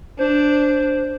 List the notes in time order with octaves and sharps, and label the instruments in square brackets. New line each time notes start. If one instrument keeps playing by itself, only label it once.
[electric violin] D4 [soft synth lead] C5